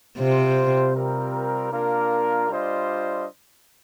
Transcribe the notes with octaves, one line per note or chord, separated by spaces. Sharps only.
C3 G3 C4 F4 C5
G3 C4 F4 A#4
A#3 D4 F4 A#4
G3 D4 F4 C5 D#5